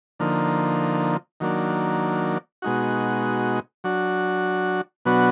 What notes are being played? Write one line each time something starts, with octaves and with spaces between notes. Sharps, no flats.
D3 F3 A#3 D#4
D#3 F#3 A#3 D4
B2 G#3 D#4 F#4
F#3 D4 F#4
B2 F#3 B3 D4 F#4